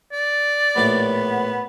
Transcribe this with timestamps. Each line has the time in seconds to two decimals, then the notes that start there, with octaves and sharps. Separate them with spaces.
0.12 D5
0.76 A#1 A2 B3 D6